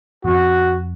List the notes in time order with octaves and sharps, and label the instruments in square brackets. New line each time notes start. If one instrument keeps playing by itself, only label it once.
[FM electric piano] F2 [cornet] F#4